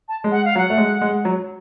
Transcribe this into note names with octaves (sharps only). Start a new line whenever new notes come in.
A5
G#3
F#5
F5
F#3 F#5
A3
G#3
G#3
F#3